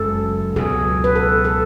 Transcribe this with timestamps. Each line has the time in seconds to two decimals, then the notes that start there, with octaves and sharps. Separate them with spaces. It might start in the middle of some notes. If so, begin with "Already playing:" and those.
Already playing: F#1 F#2 C#3 G#3 A4
0.56 C#2 B2 F#3 G#4
1.04 B4
1.16 A4
1.45 A4